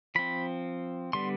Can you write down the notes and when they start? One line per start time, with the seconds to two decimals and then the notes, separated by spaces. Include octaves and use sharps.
0.15 F3 C4 B5
1.13 D3 G3 B3 C6